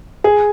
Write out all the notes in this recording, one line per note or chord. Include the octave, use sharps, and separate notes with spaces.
G#4